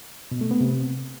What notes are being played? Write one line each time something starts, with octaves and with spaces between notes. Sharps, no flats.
B2
A3
B3
C3